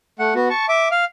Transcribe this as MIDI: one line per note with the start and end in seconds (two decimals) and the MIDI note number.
0.19 0.34 57
0.19 0.34 78
0.35 0.49 59
0.35 0.49 66
0.50 0.66 81
0.50 0.66 85
0.68 0.88 76
0.68 0.88 86
0.91 1.05 77